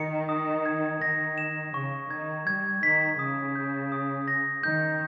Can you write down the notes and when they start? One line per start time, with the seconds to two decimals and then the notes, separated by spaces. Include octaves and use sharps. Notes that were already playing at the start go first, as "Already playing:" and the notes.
Already playing: D#3 C#7
0.29 D#6
0.66 G#6
1.01 D#3 A#6
1.38 E7
1.74 C#3 C#6
2.10 D#3 G#6
2.47 G3 G#6
2.83 D#3 B6
3.19 C#3 D#6
3.55 G6
3.92 D#6
4.28 A#6
4.63 D#3 G6